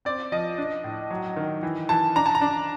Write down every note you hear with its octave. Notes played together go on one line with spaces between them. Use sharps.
C4 D5
F3 D#5
D4
A2
F#3
D#3
E3
E3 A5
D4 A#5
A5
A#5
D4